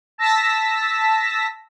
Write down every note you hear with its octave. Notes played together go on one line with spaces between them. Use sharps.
A5 E6 A#6 B6